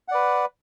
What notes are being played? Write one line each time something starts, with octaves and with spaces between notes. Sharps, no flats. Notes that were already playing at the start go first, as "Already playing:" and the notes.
B4 D5 F#5